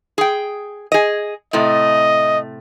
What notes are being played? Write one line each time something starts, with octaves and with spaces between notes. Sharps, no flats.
G#4 G5
G#4 D#5
A2 C3 A3 D#5